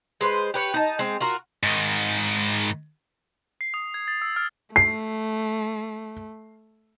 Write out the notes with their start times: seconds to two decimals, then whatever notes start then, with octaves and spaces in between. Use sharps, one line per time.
0.21 G#3 B4 C5
0.54 G4 B4 C#5
0.74 D#4 D#5 A5
0.99 G#3 C4
1.20 F4 F#4 A#4
1.63 G#2 D#3
3.61 C7
3.74 D#6
3.94 G#6
4.08 A6
4.22 E6
4.36 F6
4.76 A3 C7